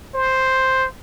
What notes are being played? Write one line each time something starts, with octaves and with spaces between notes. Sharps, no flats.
C5